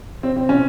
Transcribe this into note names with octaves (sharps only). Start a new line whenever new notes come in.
C4
C4
C#4